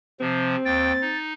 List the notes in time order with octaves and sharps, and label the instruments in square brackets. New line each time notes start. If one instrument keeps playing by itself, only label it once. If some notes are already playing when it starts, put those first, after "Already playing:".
[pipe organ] C3 F3 [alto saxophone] C4
[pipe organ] D#2 G5 [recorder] A6
[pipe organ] D#4